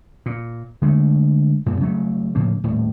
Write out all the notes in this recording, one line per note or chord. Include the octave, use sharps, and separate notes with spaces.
A#2
D3 G#3 A3
F#2 A#2 C#3
C#3 F#3 A3
A2 C#3 F3 A#3
D#1 A2